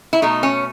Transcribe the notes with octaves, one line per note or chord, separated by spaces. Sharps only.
E4
B2 A3 D#4
C#4